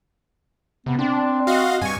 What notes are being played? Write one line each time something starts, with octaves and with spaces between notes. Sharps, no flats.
C3 B3
C4 D4
F#4 D#5 F5
G2 G#5 C#6